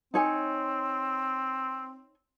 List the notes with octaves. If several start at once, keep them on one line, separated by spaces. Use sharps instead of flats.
C4 D#4 C#5 G#5